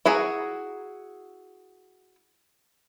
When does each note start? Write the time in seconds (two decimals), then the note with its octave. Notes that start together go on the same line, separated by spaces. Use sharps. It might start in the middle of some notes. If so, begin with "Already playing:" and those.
0.06 E4 F#4 G#4 A#5